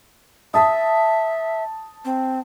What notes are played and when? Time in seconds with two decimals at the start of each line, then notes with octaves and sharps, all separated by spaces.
0.54 E5 A5 D#6
2.05 C4